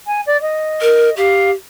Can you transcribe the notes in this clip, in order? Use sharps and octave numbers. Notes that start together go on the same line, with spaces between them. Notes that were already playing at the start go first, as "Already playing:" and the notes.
G#5
D5
D#5
A#4
G4 F5